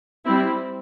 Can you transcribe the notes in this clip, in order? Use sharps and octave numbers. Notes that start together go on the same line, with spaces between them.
G3 C4 E4